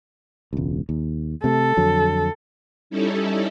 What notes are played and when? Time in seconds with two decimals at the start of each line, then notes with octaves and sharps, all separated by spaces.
0.53 E1 C#2
0.89 D#2
1.44 C3 A3 A4
1.77 F2 D3 F#3
2.90 G3 C#4 D#4 E4 A4